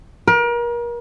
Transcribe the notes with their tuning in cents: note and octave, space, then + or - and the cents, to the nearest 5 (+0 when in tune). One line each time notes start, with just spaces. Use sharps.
A#4 +35